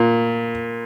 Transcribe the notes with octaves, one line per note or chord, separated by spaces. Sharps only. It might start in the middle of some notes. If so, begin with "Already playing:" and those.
Already playing: A#2